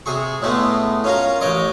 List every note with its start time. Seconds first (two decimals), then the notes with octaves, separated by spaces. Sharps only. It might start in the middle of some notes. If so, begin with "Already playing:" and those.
0.06 C3 G#4 C#6
0.42 A2 G#3 A3 B3
1.04 C#4 F4 A#4
1.41 A1 C#5 D#5 D6